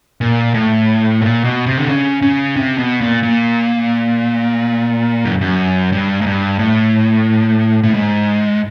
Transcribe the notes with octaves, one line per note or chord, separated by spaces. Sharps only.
A#2
A2
A#2
B2
C3
D3
C#3
C#3
C3
B2
A#2
A#2
F#2
F#2
G2
G#2
G2
A2
A2
G#2